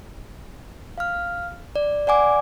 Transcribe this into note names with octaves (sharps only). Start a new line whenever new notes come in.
F5 F6
D5
D5 F#5 G#5 D6